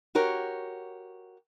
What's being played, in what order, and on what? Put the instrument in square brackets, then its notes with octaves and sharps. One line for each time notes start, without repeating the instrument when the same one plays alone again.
[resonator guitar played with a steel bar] F#4 G4 A#4 C#5